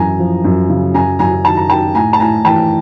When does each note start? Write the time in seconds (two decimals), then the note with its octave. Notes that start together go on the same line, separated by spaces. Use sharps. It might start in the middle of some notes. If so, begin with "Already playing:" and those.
Already playing: F#2 E3 G#5 A#5
0.19 F3
0.44 F#2
0.69 C#3
0.94 F#2 G#5 A#5
1.19 F#2 G#5 A#5
1.44 D#3 A5
1.57 A#5
1.69 D#3 G5 A5
1.95 A2 G#5 A#5
2.13 A5
2.20 A2 G#5 A#5
2.45 E3 G5 A5